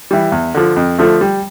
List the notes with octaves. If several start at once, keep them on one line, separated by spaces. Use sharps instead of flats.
E3 G3
E2
D3 F3
F2
D3 F3 A3
G3